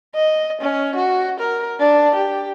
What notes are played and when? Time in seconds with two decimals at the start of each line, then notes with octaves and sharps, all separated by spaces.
0.15 D#5
0.61 C#4
0.95 F#4
1.39 A#4
1.79 D4
2.15 G4